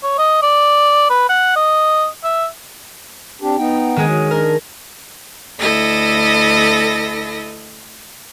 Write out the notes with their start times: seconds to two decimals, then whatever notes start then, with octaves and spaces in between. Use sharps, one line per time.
0.03 C#5
0.18 D#5
0.42 D5
1.10 B4
1.29 F#5
1.56 D#5
2.24 E5
3.42 C4 D4 G4
3.57 B3 D#4 G5
3.96 D#3 G#3 G#4
4.09 F#4 C#5
4.31 D4 A#4
5.58 D2 E4 A4 D#5 A#6